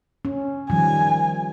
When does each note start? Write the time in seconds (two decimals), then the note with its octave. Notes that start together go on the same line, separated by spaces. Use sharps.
0.25 C#4
0.70 D#3 F3 G3 G#5